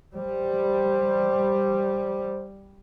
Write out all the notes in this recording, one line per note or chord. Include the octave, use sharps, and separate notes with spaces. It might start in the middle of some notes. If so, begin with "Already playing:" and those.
G3 C5